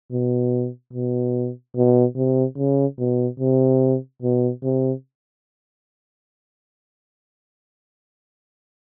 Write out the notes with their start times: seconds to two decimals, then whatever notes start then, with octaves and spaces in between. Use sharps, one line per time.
0.11 B2
0.93 B2
1.76 B2
2.16 C3
2.57 C#3
2.99 B2
3.40 C3
4.22 B2
4.63 C3